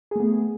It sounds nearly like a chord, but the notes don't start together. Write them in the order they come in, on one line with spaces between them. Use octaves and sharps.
G#4 A3 B3